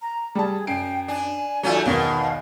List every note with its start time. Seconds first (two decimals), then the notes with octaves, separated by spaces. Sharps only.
0.02 A#5
0.35 G3 G#4 A5
0.67 F#2 G5 C7 D7
1.08 D4 G#5
1.63 D#2 F#3 A3 C#4 F4 D5
1.86 B1 E2 B2 D#3 F5